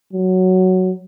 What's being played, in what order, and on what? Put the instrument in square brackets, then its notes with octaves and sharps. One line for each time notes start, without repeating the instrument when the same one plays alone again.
[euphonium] F#3